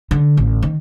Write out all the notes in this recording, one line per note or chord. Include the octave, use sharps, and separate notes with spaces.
D3
A1
D#3